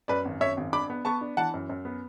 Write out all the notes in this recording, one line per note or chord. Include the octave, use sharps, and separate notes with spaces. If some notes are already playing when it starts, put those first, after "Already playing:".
F#2 B4 D5
G#1
F#2 C#5 E5
G#1
D4 B5 D6
B3
B3 A5 C#6
D4
E3 F#5 A5
F#2
F#2
B3